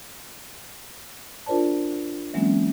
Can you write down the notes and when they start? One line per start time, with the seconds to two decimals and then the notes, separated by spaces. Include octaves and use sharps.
1.46 D4 F4 A#4 C5 D5 A5
2.34 E3 F#3 G#3 A#3 C4 C#4